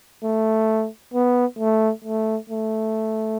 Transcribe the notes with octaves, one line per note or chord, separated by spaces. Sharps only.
A3
B3
A3
A3
A3